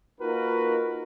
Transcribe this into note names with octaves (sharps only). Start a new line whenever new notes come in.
A#3 D#4 F4 F#4 A#4 B4